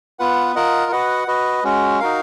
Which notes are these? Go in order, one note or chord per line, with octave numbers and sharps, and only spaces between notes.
B3 F4 B4 F#5
F4 A#4 D#5 F#5
F#4 B4 D#5 F#5
F#4 B4 D#5
G#3 C#4 F#4
D#4 F#4 A#4 F5